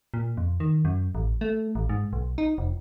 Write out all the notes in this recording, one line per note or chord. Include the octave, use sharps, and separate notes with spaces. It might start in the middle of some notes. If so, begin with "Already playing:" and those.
A#2
F2
D#3
F#2
A1
A3
A1
G#2
B1
D#4
F1